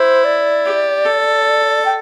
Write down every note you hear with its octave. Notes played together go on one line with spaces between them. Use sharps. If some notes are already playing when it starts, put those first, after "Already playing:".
Already playing: E4 C5
D5
G4
A4
G5